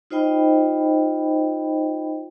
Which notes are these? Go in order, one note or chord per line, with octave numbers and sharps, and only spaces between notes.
D#4 F4 C5 D#5 G5 B5